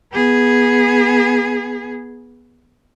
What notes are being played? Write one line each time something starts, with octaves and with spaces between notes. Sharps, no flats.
B3 G#4